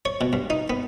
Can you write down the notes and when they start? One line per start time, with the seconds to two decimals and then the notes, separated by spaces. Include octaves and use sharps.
0.05 C#5
0.21 B2
0.33 G2
0.50 D#4
0.70 B3